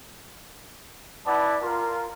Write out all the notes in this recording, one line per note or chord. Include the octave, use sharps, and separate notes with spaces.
B3 E4 D5 F#5 A5
F4 A#4